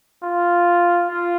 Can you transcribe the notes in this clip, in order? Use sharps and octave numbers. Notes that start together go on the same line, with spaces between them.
F4
F4